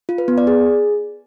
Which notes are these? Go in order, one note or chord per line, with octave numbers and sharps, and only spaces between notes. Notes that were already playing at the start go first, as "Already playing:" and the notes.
F4
B4
B3
D5
G#4